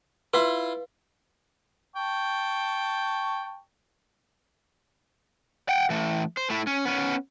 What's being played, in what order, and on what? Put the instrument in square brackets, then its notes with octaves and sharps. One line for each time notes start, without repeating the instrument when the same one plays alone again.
[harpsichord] E4 F4 [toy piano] B4 F5
[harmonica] G5 A5 C#6
[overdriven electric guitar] F#5 G5
E3 A3
C5
A3 E4
C#4
B3 C#4